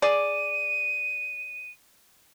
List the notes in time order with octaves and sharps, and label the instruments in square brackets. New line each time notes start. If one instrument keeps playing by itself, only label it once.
[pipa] G#4 D5 [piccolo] D#7